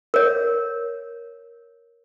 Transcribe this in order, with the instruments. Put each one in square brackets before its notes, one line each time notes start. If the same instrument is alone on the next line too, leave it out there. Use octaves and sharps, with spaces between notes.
[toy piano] A#4 C#5